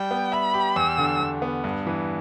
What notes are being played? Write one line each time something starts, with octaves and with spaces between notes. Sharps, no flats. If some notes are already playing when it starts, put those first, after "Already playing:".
Already playing: G3 G5
B3
E5 B5
G4
E2 E6
D3
E2
B3
G2
E3